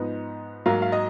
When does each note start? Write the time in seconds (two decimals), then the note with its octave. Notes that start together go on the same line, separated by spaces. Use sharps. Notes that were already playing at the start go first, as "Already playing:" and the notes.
Already playing: G#2 F3 B3 D#4 D#5
0.66 G#2 F#3 A#3 F5
0.82 F5
0.92 D#5